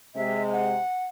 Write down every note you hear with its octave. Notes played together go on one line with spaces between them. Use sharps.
C3 G#3 E5
F#5